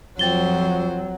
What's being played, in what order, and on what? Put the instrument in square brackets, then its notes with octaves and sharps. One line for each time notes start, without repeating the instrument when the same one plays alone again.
[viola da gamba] F2 C5 [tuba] F3 [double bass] F#3 [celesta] G5 A6 G7